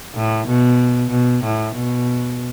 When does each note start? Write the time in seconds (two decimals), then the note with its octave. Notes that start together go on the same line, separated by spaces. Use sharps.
0.15 A2
0.47 B2
1.10 B2
1.44 A2
1.75 B2